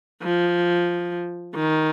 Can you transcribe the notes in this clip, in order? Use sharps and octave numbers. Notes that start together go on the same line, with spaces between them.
F3
D#3